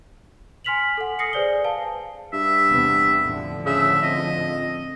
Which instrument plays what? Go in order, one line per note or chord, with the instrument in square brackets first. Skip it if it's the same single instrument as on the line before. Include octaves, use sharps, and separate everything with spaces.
[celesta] G#5 C6 F6 B6 F7 F#7
A4 F#5
D#6 A#6 C7 C#7
G#4 B4 C5 D5 G#5 G7
B4 F5 A5
[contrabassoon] G2 [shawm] E5
[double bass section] E2 C3 B3
A2 D3 F3
[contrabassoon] C#3 [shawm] E5
[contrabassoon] F2 [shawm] D#5